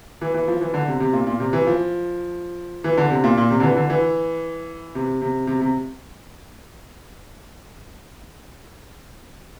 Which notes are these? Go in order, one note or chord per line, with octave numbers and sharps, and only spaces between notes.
E3
E3
F3
E3
D3
C3
C3
A#2
A#2
C3
E3
F3
E3
D3
C3
A#2
A#2
C3
D3
E3
D3
E3
C3
C3
C3
C3